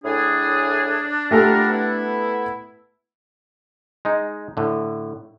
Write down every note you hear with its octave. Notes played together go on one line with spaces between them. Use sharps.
A2 D4 G#4
A3 B3 F4 G4 A4 A#4
B3 E4
G#3 D#4
A2 D3